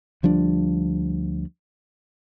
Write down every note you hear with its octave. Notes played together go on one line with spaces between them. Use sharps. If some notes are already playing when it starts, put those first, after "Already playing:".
D2 F3 G3 D4